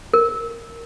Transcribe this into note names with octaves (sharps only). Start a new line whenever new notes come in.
A#4